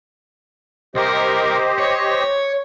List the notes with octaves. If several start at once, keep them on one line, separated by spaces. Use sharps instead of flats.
C2 G4 A#4 C5 D#5
C#5